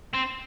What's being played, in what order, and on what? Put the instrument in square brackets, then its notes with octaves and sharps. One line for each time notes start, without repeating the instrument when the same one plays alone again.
[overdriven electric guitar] C4